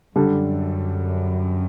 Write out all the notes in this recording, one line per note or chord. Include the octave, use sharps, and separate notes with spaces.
F#2 D3 G3 D4 A4